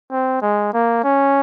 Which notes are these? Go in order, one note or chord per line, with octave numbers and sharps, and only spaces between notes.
C4
G#3
A#3
C#4